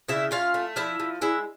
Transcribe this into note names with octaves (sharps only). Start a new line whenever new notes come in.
C#3 E4 E5
C#4 F4 F5
A3
F3 E4 E5
F3
G#3 E4 E5